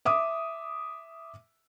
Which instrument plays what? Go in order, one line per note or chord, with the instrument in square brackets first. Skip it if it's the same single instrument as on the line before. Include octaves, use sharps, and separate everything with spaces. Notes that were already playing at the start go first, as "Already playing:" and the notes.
[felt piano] E5 D6 D#6